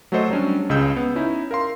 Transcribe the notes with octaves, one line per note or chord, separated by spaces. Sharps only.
F#3 A3 F#4 A4 C5 D#5
F#3 G3 C#4 D4
C#2 C#3 D#5 E6 G6
B3
C#4 D#4 E4
A#4 F5 C6